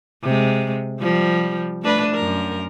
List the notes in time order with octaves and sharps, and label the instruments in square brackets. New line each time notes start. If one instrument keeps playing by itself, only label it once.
[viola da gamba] C3 G#3
F3 G3
A3 D4 B4
F#2 A#4